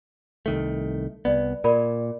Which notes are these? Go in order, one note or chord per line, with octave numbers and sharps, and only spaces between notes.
C2 D#3 A3
C2 B3 D5
A#2 A#4 D5 B5